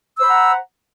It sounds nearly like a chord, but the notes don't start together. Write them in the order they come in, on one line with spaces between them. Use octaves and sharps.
E6 C5 B5 F#5 A#5